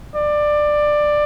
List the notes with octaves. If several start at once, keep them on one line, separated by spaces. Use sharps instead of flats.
D5